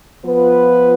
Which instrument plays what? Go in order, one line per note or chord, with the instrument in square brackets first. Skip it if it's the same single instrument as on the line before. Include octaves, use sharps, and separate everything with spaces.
[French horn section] F3 B3 F4 B4